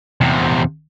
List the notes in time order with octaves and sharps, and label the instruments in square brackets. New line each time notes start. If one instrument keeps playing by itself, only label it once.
[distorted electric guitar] E2 C3